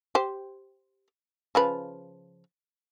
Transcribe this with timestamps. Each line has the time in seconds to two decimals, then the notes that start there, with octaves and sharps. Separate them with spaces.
0.15 G4 C5
1.55 C#3 F3 B4